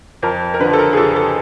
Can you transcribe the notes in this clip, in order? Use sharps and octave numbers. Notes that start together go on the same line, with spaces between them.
F2 A#4
A#4
D3 B4
F3
A4
A#4
G#4
F2 A4
A4